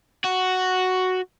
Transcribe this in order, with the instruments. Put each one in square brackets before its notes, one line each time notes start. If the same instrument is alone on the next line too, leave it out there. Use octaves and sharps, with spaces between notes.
[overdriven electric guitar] F#4